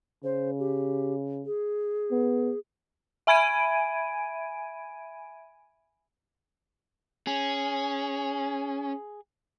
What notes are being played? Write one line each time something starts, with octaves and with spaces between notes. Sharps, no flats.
C#3 C5
G4
G#4
B3
E5 G#5 B5 G#6 D7 D#7
C#4 G#4